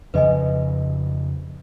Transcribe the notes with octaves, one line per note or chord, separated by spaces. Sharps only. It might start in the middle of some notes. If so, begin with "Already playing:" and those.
F2 C#3 F3 B4 D#5 G#5